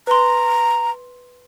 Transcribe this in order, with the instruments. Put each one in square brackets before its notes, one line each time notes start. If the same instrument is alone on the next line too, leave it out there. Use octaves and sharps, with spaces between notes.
[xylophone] B4 C6 [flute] A#5